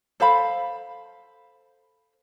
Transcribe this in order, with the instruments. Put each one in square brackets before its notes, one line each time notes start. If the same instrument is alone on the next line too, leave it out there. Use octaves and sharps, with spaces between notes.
[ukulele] A4 C5 F5 B5